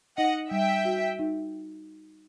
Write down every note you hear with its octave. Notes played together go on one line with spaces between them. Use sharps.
D#4 D#5 F#5
G3 E5 G5
F#4
D#4